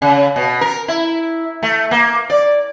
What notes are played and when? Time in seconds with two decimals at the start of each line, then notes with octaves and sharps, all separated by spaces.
0.02 C#3
0.36 B2
0.61 A#4
0.88 E4
1.62 A3
1.91 A#3
2.30 D5